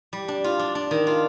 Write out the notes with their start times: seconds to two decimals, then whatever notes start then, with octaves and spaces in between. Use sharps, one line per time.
0.13 G3
0.28 D4
0.44 F4
0.59 D4
0.75 D4
0.91 D#3
1.07 F4